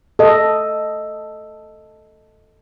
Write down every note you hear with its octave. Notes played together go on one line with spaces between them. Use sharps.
A4 D#5